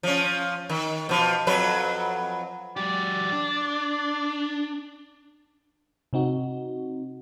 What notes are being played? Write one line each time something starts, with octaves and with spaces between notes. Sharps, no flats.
F3 C#4
D#3
B2 F3
F2 F#3 B4
F#3 G4 D5
D4
C3 C4 D#4 F#4